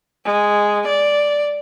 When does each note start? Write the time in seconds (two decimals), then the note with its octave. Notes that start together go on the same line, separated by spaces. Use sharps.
0.25 G#3
0.87 D5